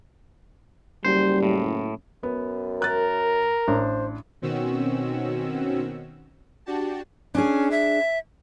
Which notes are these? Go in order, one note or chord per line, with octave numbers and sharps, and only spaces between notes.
F#1 G3 C5
A2
F#2 B3
A#4 F#6 A6
A1 D4 C5
B2 D#3 C4 C#4 F#4 E6
D4 F#4 G4 A5
C#4 D4 G#4
E5